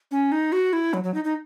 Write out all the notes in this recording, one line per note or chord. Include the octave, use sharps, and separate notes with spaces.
C#4
D#4
F#4
E4
F#3
F#3
D#4
D#4